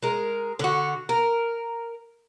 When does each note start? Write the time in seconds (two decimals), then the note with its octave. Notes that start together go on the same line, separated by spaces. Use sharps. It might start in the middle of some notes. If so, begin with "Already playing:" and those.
0.03 G#3 A#4
0.59 D3 F#4
1.09 A#4